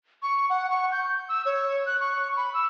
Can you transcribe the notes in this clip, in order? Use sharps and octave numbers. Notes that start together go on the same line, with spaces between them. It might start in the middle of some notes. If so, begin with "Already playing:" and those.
C#6
F#5
C#6
G6
E6
C#5
F#6
C#6
B5
E6